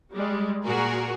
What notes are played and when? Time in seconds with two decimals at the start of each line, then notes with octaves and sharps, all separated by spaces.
0.12 G3 G#3
0.65 A#2 F#4 G#4 A#4